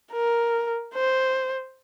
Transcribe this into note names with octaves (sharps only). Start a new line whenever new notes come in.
A#4
C5